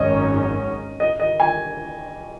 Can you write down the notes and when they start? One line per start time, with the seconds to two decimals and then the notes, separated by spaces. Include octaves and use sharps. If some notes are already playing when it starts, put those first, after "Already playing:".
Already playing: G#1 F#2 D#3 F#3 C#4 D#5
1.00 D#5
1.20 D#5
1.40 G#5